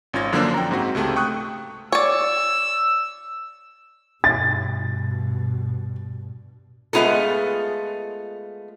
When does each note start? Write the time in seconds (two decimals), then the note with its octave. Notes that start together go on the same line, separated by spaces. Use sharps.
0.13 G#1 C#4 F4 G#6 A#6
0.32 F#2 D3 F3 A#3 D4 C5
0.54 G5 A#5
0.71 G#2 C4 F#4
0.95 C#2 C3 A3
1.16 G5 C#6 D#6 F#6
1.92 C#5 D5 E6
4.24 G2 B2 A6
6.93 G#3 A3 B3 F4 G#4 A4